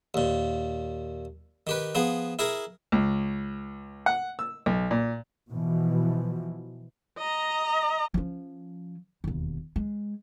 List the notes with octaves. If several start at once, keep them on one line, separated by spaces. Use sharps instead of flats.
D#2 A#2
D#3 G4 B4
F3 B3 G#4
E4 G#4 A#4
C#2
F#5
E6
B1
A#2
B2 E3 F3
D#5 A#5
F3 C#4
E1 D#2
G#3